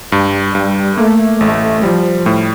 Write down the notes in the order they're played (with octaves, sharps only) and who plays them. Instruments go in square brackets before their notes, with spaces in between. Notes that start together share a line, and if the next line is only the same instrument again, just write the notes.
[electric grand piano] G2 [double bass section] G3
[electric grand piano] G2 [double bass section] G3
[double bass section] A3 [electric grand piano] A#3
[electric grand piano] A1 [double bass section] A3
[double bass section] F3 [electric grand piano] G3
[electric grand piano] A2